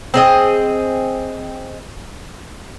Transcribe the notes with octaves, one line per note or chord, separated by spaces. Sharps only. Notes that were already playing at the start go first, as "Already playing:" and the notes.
C4 G#4 D#5